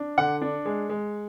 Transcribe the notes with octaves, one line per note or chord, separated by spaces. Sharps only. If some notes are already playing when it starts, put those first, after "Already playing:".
Already playing: D4
D3 F#5
D4
G#3
G#3